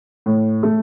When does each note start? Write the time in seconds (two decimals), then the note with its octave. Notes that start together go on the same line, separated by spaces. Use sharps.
0.26 A2
0.63 A3